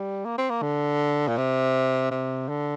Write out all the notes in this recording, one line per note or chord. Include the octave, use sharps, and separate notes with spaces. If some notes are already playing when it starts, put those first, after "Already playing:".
Already playing: G3
A#3
C4
A#3
D3
A#2
C3
C3
D3